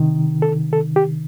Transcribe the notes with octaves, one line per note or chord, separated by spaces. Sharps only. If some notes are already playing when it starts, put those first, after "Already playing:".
Already playing: C3 D#3
A4
A4
G4